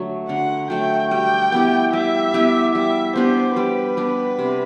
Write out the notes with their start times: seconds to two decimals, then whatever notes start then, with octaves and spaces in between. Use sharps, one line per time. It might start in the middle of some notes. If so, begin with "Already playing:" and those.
Already playing: D3 F#3 A3
0.29 D3 F#5
0.70 F#3 A3 G5
1.11 G3 G5
1.52 B3 E4 G4
1.93 G3 E5
2.34 B3 E4 G4
2.75 G3 E5
3.16 B3 D4 G4 C5
3.57 G3 B4
3.97 B3 D4 G4
4.39 C3